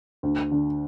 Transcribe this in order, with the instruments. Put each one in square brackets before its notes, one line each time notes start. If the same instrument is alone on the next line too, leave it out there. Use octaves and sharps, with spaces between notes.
[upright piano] D2
D3